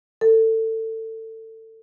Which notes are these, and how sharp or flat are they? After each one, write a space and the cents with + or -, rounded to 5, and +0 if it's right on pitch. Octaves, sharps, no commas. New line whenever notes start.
A4 +25